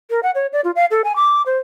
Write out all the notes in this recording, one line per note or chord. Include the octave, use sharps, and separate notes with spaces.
A#4
F#5
C#5
D5
F4
F5
A4
G#5
D6
C5